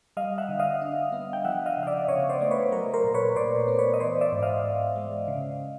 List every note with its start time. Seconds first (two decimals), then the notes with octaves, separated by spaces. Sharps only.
0.17 G3 D#5 F5
0.38 E5 F#5
0.49 D3
0.59 D#5 F5
0.81 D4
1.12 B3
1.33 G5
1.45 F3 E5 F#5
1.66 D#5 F5
1.77 C#3
1.83 F5
1.87 D5 E5
2.08 C#3 C#5 D#5
2.29 C5 D5
2.41 A3 D5
2.51 B4 C#5
2.72 F#3 A#4
2.93 A#4 C5
3.04 A#2
3.14 B4 C#5
3.36 A#2 C5 D5
3.68 B3
3.79 B4 C#5
3.94 D#5
4.00 E3 C5 D5
4.21 D5 E5
4.32 G#2
4.43 D#5 F5
4.64 G#2
4.96 G#3
5.28 C#3